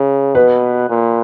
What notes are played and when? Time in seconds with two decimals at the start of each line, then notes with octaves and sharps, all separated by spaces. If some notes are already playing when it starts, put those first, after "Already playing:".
Already playing: C#3
0.35 B2 B4
0.90 A#2